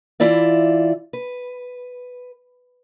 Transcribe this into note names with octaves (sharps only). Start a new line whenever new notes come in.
E3 E4 F4 D5 E5
B4